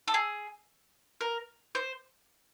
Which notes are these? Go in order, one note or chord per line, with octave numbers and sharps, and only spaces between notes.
A4
G#4
A#4
C5